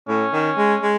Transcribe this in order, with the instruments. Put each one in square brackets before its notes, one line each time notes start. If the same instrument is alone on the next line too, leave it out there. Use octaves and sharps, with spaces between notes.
[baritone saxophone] A2 [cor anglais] C#4
[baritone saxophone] D#3
G#3
G#3